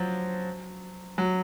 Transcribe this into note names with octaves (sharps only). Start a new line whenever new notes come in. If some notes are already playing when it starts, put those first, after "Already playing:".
Already playing: F3 F#3
F#3